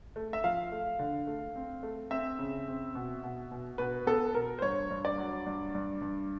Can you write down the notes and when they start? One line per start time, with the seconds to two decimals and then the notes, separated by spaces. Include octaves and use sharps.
0.16 A3
0.33 E5
0.44 F3 F5
0.72 A3
0.99 D3
1.27 A3
1.56 C4
1.83 A3
2.11 C4 E5
2.39 C#3
2.68 C4
2.95 B2
3.23 B2
3.51 B2
3.78 B2 B4
4.07 B3 A4
4.35 B2 A#4
4.59 C5
4.62 G2 C#5
4.90 G2
5.05 D5
5.18 F#3
5.46 G2
5.75 G2
6.02 G2